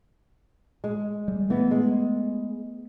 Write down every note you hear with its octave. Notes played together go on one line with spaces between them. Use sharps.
G#3
G3
E3 A3 B3
G#3